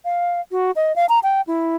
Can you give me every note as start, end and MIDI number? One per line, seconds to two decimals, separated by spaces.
0.05 0.41 77
0.51 0.71 66
0.76 0.95 75
0.96 1.06 77
1.09 1.19 82
1.23 1.41 79
1.47 1.76 64